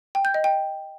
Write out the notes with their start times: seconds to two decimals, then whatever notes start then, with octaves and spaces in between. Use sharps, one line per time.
0.15 G5
0.25 G6
0.34 D#5
0.44 G5